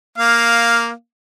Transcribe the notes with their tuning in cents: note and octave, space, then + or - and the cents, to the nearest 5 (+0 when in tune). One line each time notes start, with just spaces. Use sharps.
A#3 +0 F5 +0